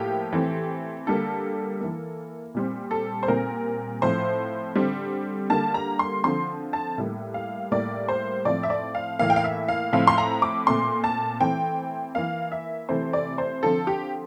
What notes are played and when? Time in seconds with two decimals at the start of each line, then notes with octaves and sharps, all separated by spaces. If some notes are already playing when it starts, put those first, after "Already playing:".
Already playing: A2 F3 A#3 G4
0.33 E3 A3 C4
1.07 D3 G3 A#3 A4
1.81 E3 A#3
2.55 A#2 G3 C4
2.91 A4
3.23 C5
3.28 A#2 G3 C4 A#4
4.02 A2 F3 C4 C5
4.75 D3 G3 C4
5.50 D3 G3 A#3 A5
5.74 A#5
5.99 C6
6.24 D3 F3 C4 C6
6.73 A5
6.98 A2 G3 A#3
7.34 F5
7.71 A2 G3 A#3 D5
8.09 C5
8.45 A2 F3 C4 D5
8.63 E5
8.70 D5
8.95 F5
9.19 A2 E3 A#3 F5
9.30 G5
9.36 F5
9.44 E5
9.68 F5
9.93 A2 F3 C4 F5
10.07 C6
10.18 A#5
10.42 D6
10.67 A#2 A3 C4 C6
11.04 A5
11.41 E3 A3 C4 G5
12.15 E3 A#3 F5
12.52 E5
12.89 C3 E3 A3 C4 C5
13.13 D5
13.38 C5
13.63 D3 F3 C4 A4
13.87 G4